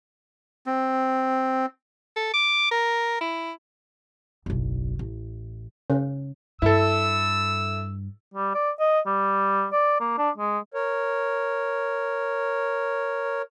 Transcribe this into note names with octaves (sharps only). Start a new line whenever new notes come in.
C4
A4
D6
A#4
E4
F#1 B1
A1
C#3
G2 E4 A4 E6
G3
D5
D#5
G3
D5
A#3
D4
G#3
A#4 C#5